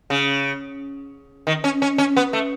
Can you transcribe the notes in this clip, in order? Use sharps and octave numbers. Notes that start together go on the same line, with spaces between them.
C#3
D#3
C#4
C#4
C#4
B3
A3